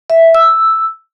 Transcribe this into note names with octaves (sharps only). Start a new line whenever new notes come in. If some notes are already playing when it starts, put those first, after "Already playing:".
E5
E6